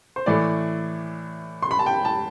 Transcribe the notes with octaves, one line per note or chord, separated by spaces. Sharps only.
C5
A2 E3 A3 D5
C6
B5
A5
G5
A5